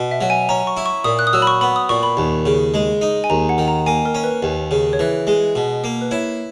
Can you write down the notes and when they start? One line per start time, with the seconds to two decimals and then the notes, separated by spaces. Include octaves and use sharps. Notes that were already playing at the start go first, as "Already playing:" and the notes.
Already playing: B2
0.11 E5
0.21 F#3
0.30 G#5
0.49 C#4 A#5
0.67 C#6
0.77 E4
0.86 C#6
1.04 A#2 D#6
1.19 F#6
1.27 D#6
1.33 F#3 E6
1.42 B5
1.47 C#6
1.61 B3 B5
1.76 D#6
1.89 A#2 C#6
2.03 B5
2.17 D#2
2.46 C#3
2.74 G#3
3.01 D#4
3.24 G#5
3.30 D#2 A#5
3.49 F#5
3.58 D#3
3.68 A#5
3.86 A#3 G#5
4.05 A#4
4.15 C#4
4.24 B4
4.43 D#2
4.71 C#3
4.93 C#5
4.99 E3 B4
5.27 G#3
5.56 B2
5.84 A#3
6.01 B4
6.11 E4 C#5